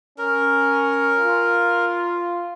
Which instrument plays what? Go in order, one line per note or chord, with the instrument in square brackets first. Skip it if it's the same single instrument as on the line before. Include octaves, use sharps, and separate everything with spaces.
[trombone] C#4 [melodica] A#4
[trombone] F4